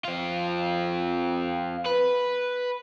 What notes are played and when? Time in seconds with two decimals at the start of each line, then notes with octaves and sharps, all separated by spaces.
0.04 C4 F4
1.86 B4